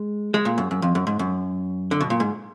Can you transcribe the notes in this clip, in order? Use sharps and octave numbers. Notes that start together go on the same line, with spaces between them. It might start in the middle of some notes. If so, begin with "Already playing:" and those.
Already playing: G#3
G#3
A#2
F#2
F#2
F2
F#2
G#2
F#2
D3
B2
A#2
G#2